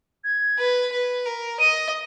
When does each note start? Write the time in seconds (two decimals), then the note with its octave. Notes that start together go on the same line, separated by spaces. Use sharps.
0.24 G#6
0.58 B4
0.92 B4
1.26 A#4
1.60 D#5 D#7